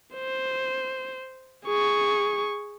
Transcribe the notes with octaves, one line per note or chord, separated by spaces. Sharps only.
C5
G#4 C#6